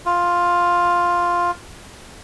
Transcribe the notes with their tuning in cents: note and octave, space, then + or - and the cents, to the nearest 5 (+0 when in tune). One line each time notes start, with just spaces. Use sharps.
F4 +5